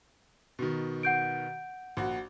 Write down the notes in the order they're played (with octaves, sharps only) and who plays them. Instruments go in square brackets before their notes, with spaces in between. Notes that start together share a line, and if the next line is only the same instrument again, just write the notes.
[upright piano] B2 D#3
[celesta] F#5 G6 D7
[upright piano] A#1 F#4